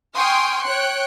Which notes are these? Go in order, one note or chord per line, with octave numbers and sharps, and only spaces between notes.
G5 G#5 C6 C#6 D#6 F6
C#5 G5 F#6 C#7